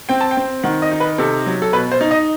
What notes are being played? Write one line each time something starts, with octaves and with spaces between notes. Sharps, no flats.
C4 G5
A5
G5
C4
D#3 F#5
D#5
D#4
B4
C3 A4
F#3
A4
B2 B4
C5
D#4
D#5